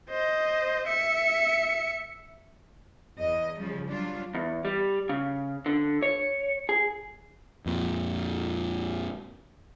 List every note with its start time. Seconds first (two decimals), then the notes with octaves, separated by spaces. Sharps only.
0.10 C5 D#5
0.88 E5 C#7
3.18 E2 D#5
3.60 C#3 F3 G3
3.90 F#3 G3 D4 F4
4.35 E2
4.65 G3
5.09 C#3
5.66 D3
6.02 C#5
6.69 G#4
7.66 F2 A#2